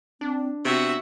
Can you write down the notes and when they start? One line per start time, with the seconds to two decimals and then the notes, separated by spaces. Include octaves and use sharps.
0.21 C4 D4
0.65 C3 B3 F#4 E5